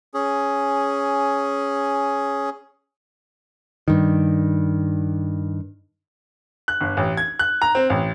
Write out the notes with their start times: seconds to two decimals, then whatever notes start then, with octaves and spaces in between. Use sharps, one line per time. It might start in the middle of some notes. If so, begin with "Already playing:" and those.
0.14 C#4 G#4
3.88 G2 D#3
6.68 F#6
6.80 G1
6.97 A1
7.17 G#6
7.39 F#6
7.62 A#5
7.75 C4
7.90 A1